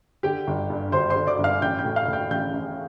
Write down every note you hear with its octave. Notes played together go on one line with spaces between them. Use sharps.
D3 G4 G5
G1
G2
G1 C5 C6
C5 C6
D3
D5 D6
G1
F5 F6
A1 G5 G6
G5 G6
A2
F5 F6
A2 G5 G6
A1 G5 G6
A1